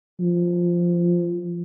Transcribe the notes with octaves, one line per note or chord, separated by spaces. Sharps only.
F3